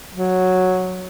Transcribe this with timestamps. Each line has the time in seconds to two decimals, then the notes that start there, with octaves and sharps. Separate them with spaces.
0.14 F#3